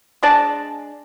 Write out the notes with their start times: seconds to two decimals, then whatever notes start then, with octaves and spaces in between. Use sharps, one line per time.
0.23 G#3 D4 D5 A5